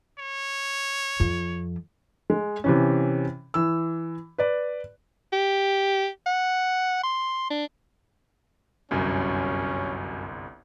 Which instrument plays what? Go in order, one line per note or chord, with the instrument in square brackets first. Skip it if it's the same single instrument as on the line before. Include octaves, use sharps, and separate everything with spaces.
[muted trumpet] C#5
[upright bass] F2 F3
[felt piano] G#3
C3 E3 C#4
E3 E6
B4 D5
[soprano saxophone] G4
F#5
C6
D4
[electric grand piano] G1 C2 [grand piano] F#2 [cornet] C#4